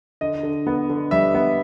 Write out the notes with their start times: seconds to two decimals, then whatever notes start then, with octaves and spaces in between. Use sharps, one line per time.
0.21 D3 D#5
0.43 D3
0.67 B3
0.89 D3
1.11 G3 E5
1.34 B3